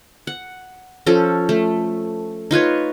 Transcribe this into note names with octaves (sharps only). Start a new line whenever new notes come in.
F#5
F3 C#4 A4
A3
D#4 F4 B4 C#5